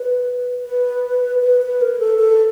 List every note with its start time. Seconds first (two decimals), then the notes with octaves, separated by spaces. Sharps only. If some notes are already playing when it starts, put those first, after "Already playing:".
Already playing: B4
0.65 B4
1.41 B4
1.62 B4
1.81 A#4
1.99 A4
2.19 A4